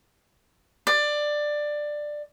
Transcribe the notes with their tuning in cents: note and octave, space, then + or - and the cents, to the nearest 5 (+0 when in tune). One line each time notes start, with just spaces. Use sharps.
D5 +15